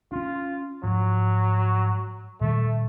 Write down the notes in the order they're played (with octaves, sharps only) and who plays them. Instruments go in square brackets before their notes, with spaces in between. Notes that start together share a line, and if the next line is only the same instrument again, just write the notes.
[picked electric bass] C#4 D4 [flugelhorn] F4
[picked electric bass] G#2 F3 [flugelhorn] F#3
[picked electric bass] A#2 D#3 G3 [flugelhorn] A3